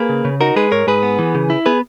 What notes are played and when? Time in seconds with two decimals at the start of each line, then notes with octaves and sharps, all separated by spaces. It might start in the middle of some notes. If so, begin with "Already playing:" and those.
Already playing: A#3 G#4 B4
0.09 C#3
0.25 C#3
0.41 D#4 F#4 A#4
0.56 G#3 G#4 B4
0.72 G#2 A#4 C#5
0.87 G#2 G#4 B4
1.03 B3
1.19 E3
1.35 C#3
1.50 E4
1.66 B3 G#4 B4